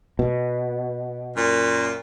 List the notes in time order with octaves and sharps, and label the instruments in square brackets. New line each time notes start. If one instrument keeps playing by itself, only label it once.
[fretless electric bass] B2
[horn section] F#2 A#2